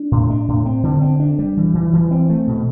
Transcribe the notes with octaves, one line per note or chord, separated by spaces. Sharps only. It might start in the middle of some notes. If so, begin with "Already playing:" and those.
Already playing: D4
A2
D4
A2
C4
D3
C4
D4
G3
E3
E3
E3
C4
A3
B2